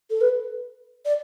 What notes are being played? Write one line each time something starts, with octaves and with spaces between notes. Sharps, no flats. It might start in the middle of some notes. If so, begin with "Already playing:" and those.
A4
B4
D5